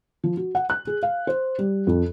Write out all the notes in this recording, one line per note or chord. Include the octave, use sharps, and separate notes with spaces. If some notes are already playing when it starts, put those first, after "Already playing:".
F3
F#4
F#5
F#6
G#4
F5
C5
G3
F2